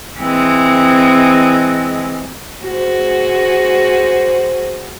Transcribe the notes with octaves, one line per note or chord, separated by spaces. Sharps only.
E3 G#3 C4
F#4 G#4 C5